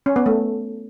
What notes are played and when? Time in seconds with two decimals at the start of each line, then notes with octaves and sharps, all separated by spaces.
0.06 C#4
0.16 B3
0.26 A3